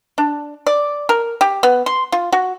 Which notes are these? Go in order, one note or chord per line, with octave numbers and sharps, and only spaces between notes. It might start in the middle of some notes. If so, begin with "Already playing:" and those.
D4
D5
A#4
G4
B3
C6
F4
F#4